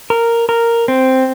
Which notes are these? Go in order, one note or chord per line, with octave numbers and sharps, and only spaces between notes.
A#4
A#4
C4